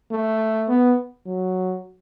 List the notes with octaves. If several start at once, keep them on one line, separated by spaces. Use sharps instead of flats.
A3
B3
F#3